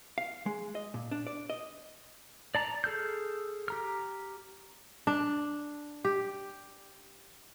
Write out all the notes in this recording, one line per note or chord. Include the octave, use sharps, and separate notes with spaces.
F5
G#3
D#5
A#2
D4
D5
D#5
D5 A5 A#5
G#4 A4 F6 G6
G4 A#5 F6
D4
G4